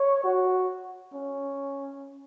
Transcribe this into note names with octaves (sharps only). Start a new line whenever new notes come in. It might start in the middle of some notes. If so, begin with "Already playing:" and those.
Already playing: C#5
F#4
C#4